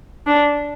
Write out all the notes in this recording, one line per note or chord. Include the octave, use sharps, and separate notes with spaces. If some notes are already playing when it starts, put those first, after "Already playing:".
D4